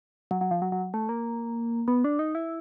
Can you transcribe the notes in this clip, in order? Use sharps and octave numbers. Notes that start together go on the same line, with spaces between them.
F#3
F#3
F3
F#3
F#3
A3
A#3
B3
D4
D#4
E4